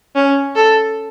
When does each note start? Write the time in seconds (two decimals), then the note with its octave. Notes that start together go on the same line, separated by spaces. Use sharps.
0.15 C#4
0.55 A4